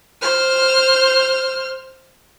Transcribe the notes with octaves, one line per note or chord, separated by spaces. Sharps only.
C5 F6